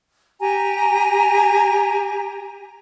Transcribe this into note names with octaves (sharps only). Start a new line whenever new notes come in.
G4 G#5 A#5